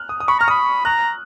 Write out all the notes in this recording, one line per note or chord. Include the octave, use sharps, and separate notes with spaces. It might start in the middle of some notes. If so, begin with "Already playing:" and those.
Already playing: F6 F#6
D#6
D#6
B5 C#6
A#5 F6
B5 D#6
A#5 F#6